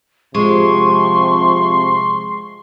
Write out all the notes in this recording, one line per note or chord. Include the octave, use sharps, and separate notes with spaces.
C3 F3 G#3 C6 C#6